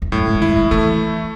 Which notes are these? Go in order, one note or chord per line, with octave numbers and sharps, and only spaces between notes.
E2
F#2 A2
G#2
E3
D#3 E4
E3
E3 A3